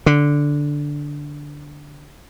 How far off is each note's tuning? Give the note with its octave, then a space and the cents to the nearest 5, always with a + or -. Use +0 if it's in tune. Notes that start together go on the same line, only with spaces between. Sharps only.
D3 -5